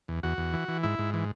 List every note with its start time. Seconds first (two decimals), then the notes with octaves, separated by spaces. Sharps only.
0.08 E2
0.23 E2 F#4
0.38 E2
0.53 E3
0.68 E3
0.83 G#2 E4
0.99 G#2
1.14 E3